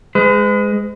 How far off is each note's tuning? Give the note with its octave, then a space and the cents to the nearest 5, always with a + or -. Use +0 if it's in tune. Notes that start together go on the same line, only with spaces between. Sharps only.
G#3 +0 B4 +45